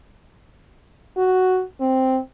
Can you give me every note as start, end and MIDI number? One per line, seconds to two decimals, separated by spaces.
1.17 1.63 66
1.81 2.19 60